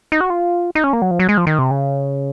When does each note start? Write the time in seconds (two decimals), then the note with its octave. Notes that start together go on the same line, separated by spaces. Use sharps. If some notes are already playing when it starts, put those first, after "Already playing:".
0.12 D#4
0.21 F#4
0.30 F4
0.75 D#4
0.84 C#4
0.93 A#3
1.02 F#3
1.11 F3
1.19 F#3
1.29 G#3
1.37 F3
1.47 D#3
1.59 C3
1.71 C#3